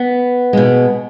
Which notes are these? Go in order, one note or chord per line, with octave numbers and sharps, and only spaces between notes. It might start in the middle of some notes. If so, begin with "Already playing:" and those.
Already playing: B3
B2 G#3